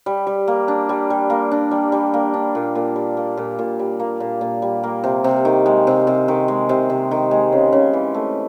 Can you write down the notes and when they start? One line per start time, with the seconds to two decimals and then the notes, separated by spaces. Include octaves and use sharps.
0.06 G3
0.27 G3
0.48 A#3
0.68 D4
0.89 G3
1.10 G3
1.30 A#3
1.51 D4
1.71 G3
1.92 G3
2.14 A#3
2.34 D4
2.55 A#2
2.75 A#2
2.96 G3
3.17 A#3
3.37 A#2
3.59 A#2
3.79 G3
4.00 A#3
4.20 A#2
4.41 A#2
4.62 G3
4.83 A#3
5.04 C3
5.24 C3
5.45 D#3
5.66 G#3
5.87 C3
6.07 C3
6.28 D#3
6.48 G#3
6.69 C3
6.90 C3
7.11 D#3
7.31 G#3
7.53 C#3
7.73 C#3
7.93 E3
8.14 A3